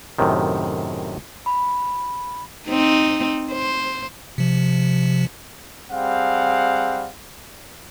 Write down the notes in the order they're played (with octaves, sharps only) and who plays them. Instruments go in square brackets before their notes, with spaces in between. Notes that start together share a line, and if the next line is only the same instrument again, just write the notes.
[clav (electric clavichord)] F#2 A2 C3 D#3
[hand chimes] B5
[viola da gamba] C4 D#4
C5
[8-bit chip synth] C3 F3
[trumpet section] G3 C4 G#4 F5 F#5